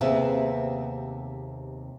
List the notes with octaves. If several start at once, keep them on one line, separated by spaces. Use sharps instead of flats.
D#2 C3 B3 C4 G#4 E5